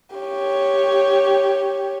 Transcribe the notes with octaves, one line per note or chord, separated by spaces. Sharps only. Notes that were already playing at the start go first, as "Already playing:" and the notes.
G4 C#5